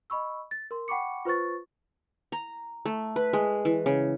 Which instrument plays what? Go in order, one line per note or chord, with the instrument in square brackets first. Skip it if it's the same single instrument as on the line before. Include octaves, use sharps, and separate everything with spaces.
[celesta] D#5 B5 C#6 E6
A6
A#4 C6
F#5 G5 B5 C#6 D6 C#7
F4 B4 C5 C#6 A6
[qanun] A#5
A3
B4
G#3
E3
C#3